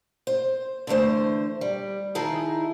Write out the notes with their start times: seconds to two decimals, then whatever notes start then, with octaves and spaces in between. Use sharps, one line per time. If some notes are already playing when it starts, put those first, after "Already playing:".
0.27 C5
0.87 D3 E3 G#3 A3 C5
1.61 G3
2.15 D#3 D#4 E4 G#4 A5